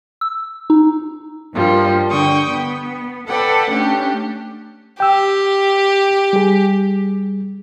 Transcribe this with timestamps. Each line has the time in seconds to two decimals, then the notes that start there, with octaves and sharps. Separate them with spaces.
0.21 E6
0.70 D#4
1.54 G2 F3 G3 A#3
2.10 D3 G5 C#6 D#6
2.52 B3
3.28 A4 B4 D5 F#5 G5
3.72 A3 C#4 D4 G4
5.00 G4 G5 E6
6.33 G3 G#4